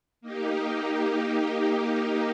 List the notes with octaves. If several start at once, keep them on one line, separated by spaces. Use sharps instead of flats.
A#3 D#4 G4